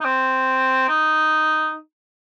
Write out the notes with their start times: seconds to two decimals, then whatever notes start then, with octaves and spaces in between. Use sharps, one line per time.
0.01 D#4
0.04 C4
0.89 D#4